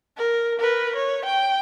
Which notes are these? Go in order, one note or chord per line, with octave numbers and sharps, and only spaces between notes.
A#4
A#4 B4
C#5
G5